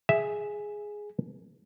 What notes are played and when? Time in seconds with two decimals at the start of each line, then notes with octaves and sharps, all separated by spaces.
0.09 G#4 E5